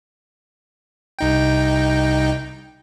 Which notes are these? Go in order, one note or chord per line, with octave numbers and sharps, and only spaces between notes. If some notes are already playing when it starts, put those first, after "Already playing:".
C2 D#4 G5